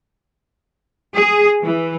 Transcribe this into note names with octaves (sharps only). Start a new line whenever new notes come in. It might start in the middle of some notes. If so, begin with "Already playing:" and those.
G#4
E3